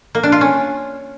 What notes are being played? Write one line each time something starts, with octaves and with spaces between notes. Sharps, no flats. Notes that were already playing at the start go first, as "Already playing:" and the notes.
A#3
D4
F4
C#4